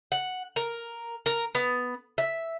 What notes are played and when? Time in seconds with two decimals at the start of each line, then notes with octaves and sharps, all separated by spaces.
0.12 F#5
0.56 A#4
1.26 A#4
1.55 B3
2.18 E5